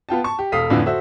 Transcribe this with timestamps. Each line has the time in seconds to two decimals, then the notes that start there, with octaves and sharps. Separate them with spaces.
0.09 B3 F4 G5 A5
0.24 A5 C#6
0.39 G4
0.52 E1 A4 F5 D#6 B6
0.70 F2 A2 D3 E3 E4 F4
0.86 F#4 A4 C5 E5